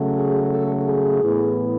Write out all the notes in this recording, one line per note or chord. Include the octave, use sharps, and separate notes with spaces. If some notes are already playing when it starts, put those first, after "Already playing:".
Already playing: C#3 F#3 A3
G#4
A4
G#4
A2 E3 B3